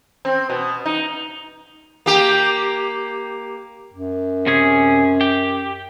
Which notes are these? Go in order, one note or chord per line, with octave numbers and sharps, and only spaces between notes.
C4
B2
D#4
A#3 G4
F#2
C3 C#4 G#4
G4